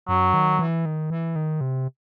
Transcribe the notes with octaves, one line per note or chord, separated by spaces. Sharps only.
F#2 F#3
D#3
E3
D#3
E3
D#3
C3